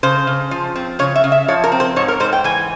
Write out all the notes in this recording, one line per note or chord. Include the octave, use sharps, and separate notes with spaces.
C#3 C5
C#3
F3
C4
C#3 C#5
E5
C#3
E5
F3 C#5
A#4
C4
C5
G#2 C#5
A#4
G#2 C5
G5
E3 G#5